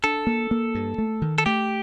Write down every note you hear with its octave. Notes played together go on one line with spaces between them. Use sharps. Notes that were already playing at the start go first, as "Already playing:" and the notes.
D4 A4
A#3
A#3
G2
A3
D#3
A4
A3 G4